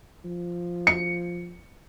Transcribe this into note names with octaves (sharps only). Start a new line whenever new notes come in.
F3
C#7